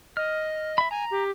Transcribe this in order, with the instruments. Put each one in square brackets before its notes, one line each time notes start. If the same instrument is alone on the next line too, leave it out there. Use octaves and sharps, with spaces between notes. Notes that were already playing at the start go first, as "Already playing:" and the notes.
[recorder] D#5 [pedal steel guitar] F6
[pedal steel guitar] E5 B5
[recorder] G#5 [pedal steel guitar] A#5
[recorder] G4